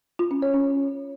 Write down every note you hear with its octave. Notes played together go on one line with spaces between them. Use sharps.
F4
C#4
C#5
C#4